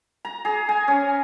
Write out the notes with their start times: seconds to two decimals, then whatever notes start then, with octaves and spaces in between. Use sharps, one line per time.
0.25 A#5
0.45 G#4
0.69 G#5
0.88 C#4